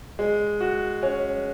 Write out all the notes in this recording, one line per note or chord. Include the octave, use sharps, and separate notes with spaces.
G#3
F#4
C#4